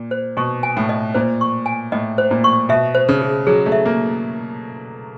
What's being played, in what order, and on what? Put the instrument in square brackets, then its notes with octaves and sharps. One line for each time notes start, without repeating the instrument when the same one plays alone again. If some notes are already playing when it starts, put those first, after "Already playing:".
Already playing: [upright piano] A#2
[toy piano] C5
[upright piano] B2 [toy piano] C#6
[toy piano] G#5
[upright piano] A2
[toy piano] D#5
[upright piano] A#2 [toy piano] C5
[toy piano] C#6
G#5
[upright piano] A2 [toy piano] D#5
[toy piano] C5
[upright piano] A#2
[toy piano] C#6
[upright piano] B2 [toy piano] E5
[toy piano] C5
[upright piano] C#3
[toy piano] G#4
[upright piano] F#3 [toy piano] G#4
[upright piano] A3
[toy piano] E5
[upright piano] A#3